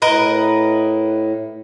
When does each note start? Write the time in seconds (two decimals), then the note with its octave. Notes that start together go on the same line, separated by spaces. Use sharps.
0.02 A2 A#4 B4 D#5